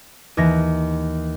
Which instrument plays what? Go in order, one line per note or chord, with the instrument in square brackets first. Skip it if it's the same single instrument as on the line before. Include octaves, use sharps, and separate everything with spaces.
[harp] D#2 E3 A#6